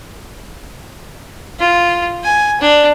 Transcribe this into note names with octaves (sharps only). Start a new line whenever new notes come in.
F4
G#5
D4